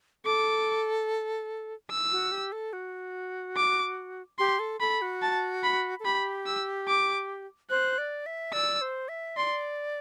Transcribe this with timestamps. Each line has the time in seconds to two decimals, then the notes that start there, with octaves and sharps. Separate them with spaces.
0.25 A4 D6
1.90 E6
2.12 F#4
2.32 G4
2.52 A4
2.73 F#4
3.56 D6
4.39 G4 C6
4.59 A4
4.81 A4 B5
5.02 F#4
5.22 A5
5.63 B5
6.00 A4
6.05 G4 B5
6.46 E6
6.88 D6
7.70 C5 F#6
7.98 D5
8.26 E5
8.53 D5 E6
8.81 C5
9.09 E5
9.37 D5 C6